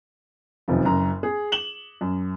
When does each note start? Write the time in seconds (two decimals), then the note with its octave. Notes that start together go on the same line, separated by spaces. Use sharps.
0.68 F1 F#2 C3 D#3 F3
0.84 F#1 F#2 A#5
1.23 G#4
1.52 E7 F#7 G7
2.01 F#2